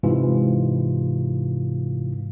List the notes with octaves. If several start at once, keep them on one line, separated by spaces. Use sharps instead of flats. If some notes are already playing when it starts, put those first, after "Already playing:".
G#2 C3 E3 F4